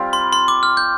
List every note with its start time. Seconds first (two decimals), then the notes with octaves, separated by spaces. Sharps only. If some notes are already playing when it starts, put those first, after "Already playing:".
Already playing: G3 C4 F4
0.13 C6
0.33 C6
0.48 D6
0.63 F6
0.77 G6